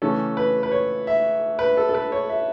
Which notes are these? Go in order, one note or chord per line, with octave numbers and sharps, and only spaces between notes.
C#3 E3 A3 C#4 A4
B4
B4
C#5
E5
B4
A4
A4
B4
C#5
E5